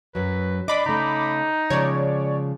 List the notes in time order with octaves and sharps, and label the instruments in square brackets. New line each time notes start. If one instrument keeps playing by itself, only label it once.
[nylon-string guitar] F#2 F#3 [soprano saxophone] B4
[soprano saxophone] D4 [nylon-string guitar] D#5 [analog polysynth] B5 D6
[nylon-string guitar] C#3 A3 [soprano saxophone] D#4
[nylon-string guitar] C#3 F3 G#3 [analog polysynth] C#5 D5